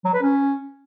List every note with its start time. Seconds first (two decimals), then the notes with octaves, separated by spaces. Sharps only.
0.05 F#3
0.14 B4
0.22 C#4